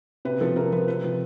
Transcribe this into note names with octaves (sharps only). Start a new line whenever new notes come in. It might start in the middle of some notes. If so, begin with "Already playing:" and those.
C3 B4
F3 A4
C3 A#4
F3 B4
C3 B4
F3